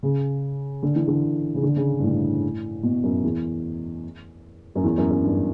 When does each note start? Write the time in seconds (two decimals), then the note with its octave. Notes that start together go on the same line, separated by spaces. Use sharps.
0.03 C#3
0.83 D3
0.95 E3
1.07 D3
1.55 C#3
1.63 D3
1.76 C#3
1.99 G2
2.03 A2
2.83 B2
3.03 F#2
3.23 E2
4.75 F#2
4.84 E2
4.97 F#2
5.11 F#2
5.23 G2